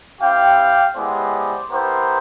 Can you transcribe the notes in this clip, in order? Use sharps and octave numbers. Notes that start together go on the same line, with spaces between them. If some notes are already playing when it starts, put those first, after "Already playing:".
C4 E4 G4 F5 G5
G#3 B3 E4 G4 C5 D5
B3 E4 G4 A#4 C5